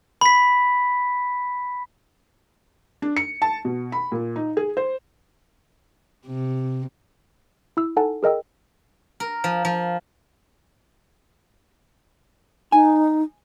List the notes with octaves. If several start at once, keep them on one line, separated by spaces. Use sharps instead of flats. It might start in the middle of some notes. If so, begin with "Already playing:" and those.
B5 B6
D4
C#7
A5
B2
B5
A#2
D#4
G#4
C5
C3
E4 E6
D#4 A4 F#5 G#5 A5
G#4 A#4 D#5 G5 E6
A#4
F3
F3
D#4 G#5